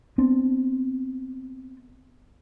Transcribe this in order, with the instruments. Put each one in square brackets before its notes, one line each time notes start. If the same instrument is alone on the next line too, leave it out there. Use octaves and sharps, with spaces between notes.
[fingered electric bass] B3 C4 D4